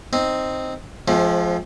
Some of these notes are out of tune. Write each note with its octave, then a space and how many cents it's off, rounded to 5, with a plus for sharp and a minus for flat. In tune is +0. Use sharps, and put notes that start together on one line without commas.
C4 +0 D#4 +0
F3 +0 G#3 +40 C4 +25